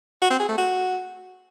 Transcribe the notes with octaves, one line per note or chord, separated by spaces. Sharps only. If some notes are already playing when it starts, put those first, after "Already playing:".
F#4
C4
G#4
A3
F#4